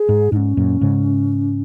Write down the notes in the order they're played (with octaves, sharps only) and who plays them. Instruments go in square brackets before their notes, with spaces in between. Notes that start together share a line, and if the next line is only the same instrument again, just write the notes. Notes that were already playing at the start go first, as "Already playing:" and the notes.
Already playing: [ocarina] G#4
[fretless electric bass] G#2
[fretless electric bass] G#2 [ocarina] D#4
[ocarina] C#4
[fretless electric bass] F#2 A#2
G#2 C#3